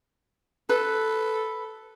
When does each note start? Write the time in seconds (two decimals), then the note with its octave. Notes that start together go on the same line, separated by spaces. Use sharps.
0.69 A4 B4